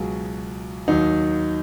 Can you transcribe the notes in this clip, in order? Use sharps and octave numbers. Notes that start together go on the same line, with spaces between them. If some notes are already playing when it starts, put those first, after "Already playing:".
Already playing: C#2 B2 F#3 G#4
D#2 D#3 F#3 D#4